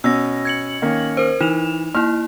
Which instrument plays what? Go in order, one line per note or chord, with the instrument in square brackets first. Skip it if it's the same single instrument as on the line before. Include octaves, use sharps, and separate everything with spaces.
[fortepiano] B2 C#4 [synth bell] E6 A#6
[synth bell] G#6 C#7 F#7
[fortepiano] D#3 A#3 C#4
[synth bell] A#4 C5
[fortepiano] E3 [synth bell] D#4 E7 F7
[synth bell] A#3 E4 [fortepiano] F6